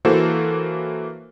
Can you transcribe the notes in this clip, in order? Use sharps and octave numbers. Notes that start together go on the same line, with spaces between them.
E3 A#3 F#4 A4 C5